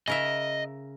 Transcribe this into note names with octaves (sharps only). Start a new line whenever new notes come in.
C#3 A#4 D#5 E5